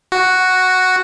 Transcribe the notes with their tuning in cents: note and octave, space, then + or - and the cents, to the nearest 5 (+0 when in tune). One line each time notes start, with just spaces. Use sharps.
F#4 +0